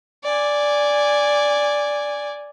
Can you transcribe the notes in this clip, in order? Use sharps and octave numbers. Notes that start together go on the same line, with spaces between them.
D5 G#5